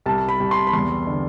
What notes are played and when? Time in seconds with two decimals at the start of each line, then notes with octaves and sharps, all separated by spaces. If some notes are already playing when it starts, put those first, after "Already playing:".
0.06 C2 A5
0.29 B5
0.40 C2
0.51 C6
0.67 B5
0.73 E2 C6
1.07 D3